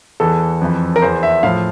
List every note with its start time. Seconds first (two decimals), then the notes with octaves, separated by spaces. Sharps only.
0.20 E2 E3 A4
0.62 F2 E3
0.96 A#4
1.02 E2 E3 C5
1.23 E5
1.43 A2 F3 F5